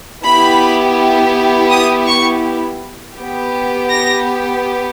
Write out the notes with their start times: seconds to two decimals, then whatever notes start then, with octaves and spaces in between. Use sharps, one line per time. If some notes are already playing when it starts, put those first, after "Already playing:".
0.24 B3 E4 G4 B5
1.70 D#6
2.07 C#6
3.17 B3 G4
3.91 A#6